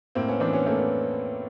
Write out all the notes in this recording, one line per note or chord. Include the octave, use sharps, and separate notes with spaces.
A2 A#3 C4
B3 C#4
E3 C4 D4
B3 C#4
A3 A#3 C4
B3